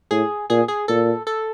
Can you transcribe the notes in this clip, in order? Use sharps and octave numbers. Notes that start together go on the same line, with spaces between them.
A2 G#4
A#2 G#4
G#4
A#2 A4
A4